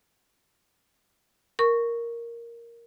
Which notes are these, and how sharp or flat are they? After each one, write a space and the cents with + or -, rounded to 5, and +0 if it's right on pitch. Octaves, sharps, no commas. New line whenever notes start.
A#4 +0 C#6 +0